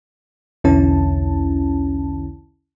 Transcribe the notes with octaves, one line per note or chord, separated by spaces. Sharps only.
B1 E2 D3 C#4 E4 A5